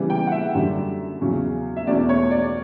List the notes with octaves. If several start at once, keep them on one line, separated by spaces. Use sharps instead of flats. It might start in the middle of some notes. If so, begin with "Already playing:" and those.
Already playing: C#3 E3 G3 B3
G5
F#5
E5
F#2 D3 G3
E2 C#3 F#3 C#4
E5
E2 B2 A3 C#4 D5
C#5
D5